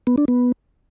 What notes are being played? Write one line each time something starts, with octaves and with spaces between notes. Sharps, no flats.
B3
D4
B3